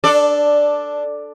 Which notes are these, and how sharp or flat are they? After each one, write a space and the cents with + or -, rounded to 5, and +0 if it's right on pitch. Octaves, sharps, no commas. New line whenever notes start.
D4 +5 A4 +0 D5 +0